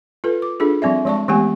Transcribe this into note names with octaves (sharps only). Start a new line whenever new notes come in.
F4 A4 B4
D6
D4 F4 G#4 A4
F3 G3 C4 D5 E5
F3 G#3 D5 A5 C#6
E3 G#3 A3 B3 G4 G#5